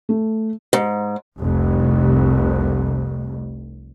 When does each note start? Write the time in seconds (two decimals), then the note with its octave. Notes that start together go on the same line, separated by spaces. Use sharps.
0.09 A3
0.73 G#2
1.38 F1 C2